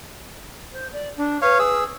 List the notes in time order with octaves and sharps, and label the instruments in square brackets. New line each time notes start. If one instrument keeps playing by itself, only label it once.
[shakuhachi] C5
D5
D4
[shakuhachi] B4 [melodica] C#5 F5
[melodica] G#4 E6